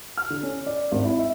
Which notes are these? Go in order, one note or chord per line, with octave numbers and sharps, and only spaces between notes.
F6
D3
C#4
D5
G#1
E4
E5